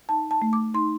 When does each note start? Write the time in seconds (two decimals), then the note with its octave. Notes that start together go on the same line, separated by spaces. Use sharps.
0.09 D#4 A5
0.31 A5
0.42 A3
0.53 D6
0.74 D#4 C6